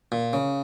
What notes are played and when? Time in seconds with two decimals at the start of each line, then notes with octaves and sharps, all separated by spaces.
0.12 A#2
0.33 C#3